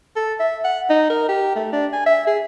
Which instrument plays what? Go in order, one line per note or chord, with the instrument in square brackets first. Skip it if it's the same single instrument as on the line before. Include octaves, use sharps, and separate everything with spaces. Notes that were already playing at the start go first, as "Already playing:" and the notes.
[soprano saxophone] A4
E5
F#5
D#4
A#4
G4
A3
D4
G#5
E5
G#4